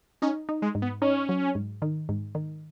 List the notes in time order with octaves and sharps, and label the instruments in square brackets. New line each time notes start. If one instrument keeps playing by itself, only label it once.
[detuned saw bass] C#4 [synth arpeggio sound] D#4
[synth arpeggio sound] D#4
[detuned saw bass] G#3
[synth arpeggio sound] G#2
[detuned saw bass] B3
[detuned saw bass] C#4 [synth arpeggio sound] D#4
[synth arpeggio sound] F#3
G#2
D#3
G#2
D#3